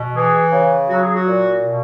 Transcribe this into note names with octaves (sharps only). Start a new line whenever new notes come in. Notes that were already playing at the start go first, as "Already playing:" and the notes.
Already playing: B2
E3 G#4
C#3
F#3 F#4
G#4
F#4
A#2
B2